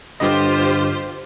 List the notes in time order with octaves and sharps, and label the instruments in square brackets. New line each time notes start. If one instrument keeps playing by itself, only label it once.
[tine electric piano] G2 D3 D#5 [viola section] F4 G4 C5